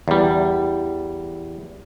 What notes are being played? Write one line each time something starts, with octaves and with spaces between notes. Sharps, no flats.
E2 G3